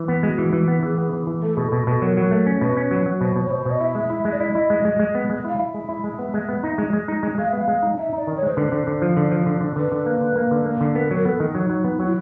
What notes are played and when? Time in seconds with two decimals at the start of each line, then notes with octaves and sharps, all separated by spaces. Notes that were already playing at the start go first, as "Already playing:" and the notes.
Already playing: E3
0.08 B3
0.23 G#3 F#4
0.38 E3
0.53 E3
0.68 B3
0.83 E3 G#4
0.98 B3
1.13 E3
1.27 E3
1.42 A3 A4
1.56 B2 G#4
1.68 B2 A4
1.87 B2 A4
2.02 F#3 A#4
2.17 F#3
2.31 A3
2.46 C#4
2.61 B2 B4
2.77 C#4
2.91 F#3
3.06 F#3
3.20 B2 C5
3.36 B2
3.45 C#5
3.50 B2 C5
3.65 B2
3.71 D#5
3.80 E4 E5
3.95 G#3
4.10 E4
4.25 G#3
4.32 D5
4.40 E4 D#5
4.55 E4
4.70 G#3
4.85 G#3
4.99 G#3
5.15 B3
5.30 G#3
5.45 E4 F5
5.59 E4 E5
5.74 G#3
5.89 E4
6.04 G#3
6.19 B3
6.34 G#3
6.49 B3
6.64 D#4
6.78 G#3
6.93 G#3
7.08 D#4
7.23 G#3
7.38 G#3 F5
7.49 B3 E5
7.58 F5
7.68 G#3
7.83 D#4
7.98 D#4 E5
8.13 D#4 D5
8.27 D#3
8.37 C#5
8.42 G#3 C5
8.55 D3 B4
8.64 C5
8.72 D3
8.87 D3
9.02 F3
9.17 D3
9.31 F3
9.46 D3
9.61 D3
9.76 D3 B4
9.92 D3
10.06 A#3
10.21 D3
10.36 A#3
10.51 D3
10.65 A#3
10.81 D3
10.95 B3 A#4
11.11 F#3
11.16 A#4
11.25 B3 A4
11.40 D#3
11.55 F#3 D#4
11.70 F#3
11.84 B3
12.00 F#3
12.05 E4